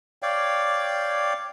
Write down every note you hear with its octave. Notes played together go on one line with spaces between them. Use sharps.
C#5 D5 F5 G5